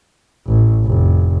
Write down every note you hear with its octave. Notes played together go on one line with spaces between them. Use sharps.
A1
F1